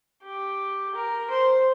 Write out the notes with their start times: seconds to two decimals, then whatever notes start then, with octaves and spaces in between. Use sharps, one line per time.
0.23 G4
0.94 A#4
1.30 C5